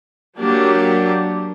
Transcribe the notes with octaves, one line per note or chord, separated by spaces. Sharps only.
F#3 A#3 D4 G4